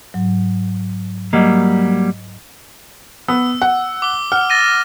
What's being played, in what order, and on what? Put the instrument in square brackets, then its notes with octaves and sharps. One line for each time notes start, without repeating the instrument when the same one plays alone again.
[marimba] G#2 F#3
[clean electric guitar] F#3 G3 A#3 [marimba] D#5
[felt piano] B3 [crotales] E6
[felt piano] F#5
[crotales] D6 G7
[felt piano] F#5 [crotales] F6
[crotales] A6 A#6 D#7